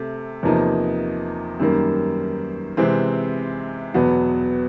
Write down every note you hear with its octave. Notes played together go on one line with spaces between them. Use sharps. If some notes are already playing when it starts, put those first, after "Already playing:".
Already playing: C3 A3
E2 C3 F3 A#3 D#4
F#2 D#3 G3 A#3
C3 E3 G#3 C4
E2 B2 F#3 B3